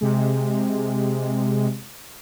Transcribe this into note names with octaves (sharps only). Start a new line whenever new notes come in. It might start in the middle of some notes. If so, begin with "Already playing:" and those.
C3 G#3